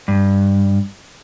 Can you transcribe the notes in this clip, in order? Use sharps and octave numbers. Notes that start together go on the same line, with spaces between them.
G2